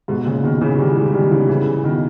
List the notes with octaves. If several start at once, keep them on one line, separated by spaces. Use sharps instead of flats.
G#2 B2
A#2 C#3
B2 D#3
C#3 E3
D#3 G3
E3 G#3
D#3 G3
C#3 E3
C#3 E3
B2 D#3